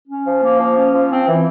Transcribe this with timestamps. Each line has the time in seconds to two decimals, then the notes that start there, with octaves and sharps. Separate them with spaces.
0.08 C#4
0.26 F3
0.43 A#3
0.60 F3
0.77 C#4
0.93 F3
1.10 C4
1.28 E3